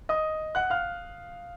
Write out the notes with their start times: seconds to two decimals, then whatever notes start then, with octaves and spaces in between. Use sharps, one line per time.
0.09 D#5 D#6
0.55 F#5 F#6
0.70 F5 F6